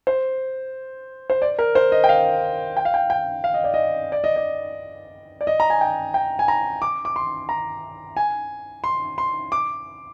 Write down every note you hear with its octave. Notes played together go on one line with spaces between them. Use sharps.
C5
C5
D5
A#4
C5
D#5
G5
F5
G5
F5
G5
G5
F5
D#5
D5
D#5
D5
D#5
D5
D5
D#5
A#5
G#5
G5
G5
G#5
A#5
D6
D6
C6
A#5
G#5
C6
C6
D6